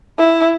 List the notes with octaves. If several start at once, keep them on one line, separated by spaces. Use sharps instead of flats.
E4